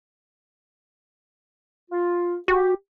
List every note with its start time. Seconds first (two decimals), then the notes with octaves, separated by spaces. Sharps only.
1.91 F4
2.48 F#4 G4